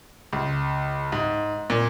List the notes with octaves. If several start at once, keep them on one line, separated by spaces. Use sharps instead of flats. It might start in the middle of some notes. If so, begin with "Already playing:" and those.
C#2
G#2
A#2